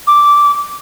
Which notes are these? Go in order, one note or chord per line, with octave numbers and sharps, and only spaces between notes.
D6